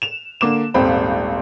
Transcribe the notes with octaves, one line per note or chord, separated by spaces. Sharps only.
E7 F7
D3 A#3 D6 E7
D#1 G#1 C4 B5